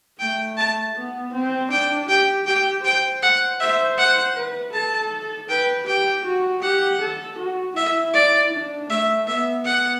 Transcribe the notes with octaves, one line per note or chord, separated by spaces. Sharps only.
A3 G5
A5
B3
C4
D4 G5
G4 G5
G4 G5
C5 G5
F#5
C5 E5
F#5
B4
A4 A5
B4 G5
G4 G5
F#4
G4 F#5
A4
F#4
E4 E5
D5
D4
A3 E5
B3 E5
B3 F#5